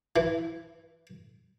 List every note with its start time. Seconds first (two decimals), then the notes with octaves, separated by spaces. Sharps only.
0.16 E3